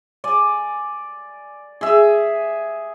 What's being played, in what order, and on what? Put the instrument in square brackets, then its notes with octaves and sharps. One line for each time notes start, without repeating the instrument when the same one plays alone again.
[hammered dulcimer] D5 G#5
G#4 E5